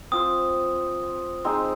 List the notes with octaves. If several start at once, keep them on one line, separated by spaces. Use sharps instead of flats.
C4 F4 C5 D#6
G#3 C4 D#4